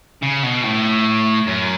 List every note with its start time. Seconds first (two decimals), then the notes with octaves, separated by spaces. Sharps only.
0.22 C#3
0.43 B2
0.63 A2
1.47 F#2